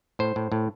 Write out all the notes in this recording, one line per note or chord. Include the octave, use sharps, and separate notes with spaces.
A2 C5
A2
A2